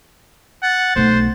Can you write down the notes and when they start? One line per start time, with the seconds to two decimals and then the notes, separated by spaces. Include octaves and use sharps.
0.63 F#5 A6
0.96 B1 A3 C5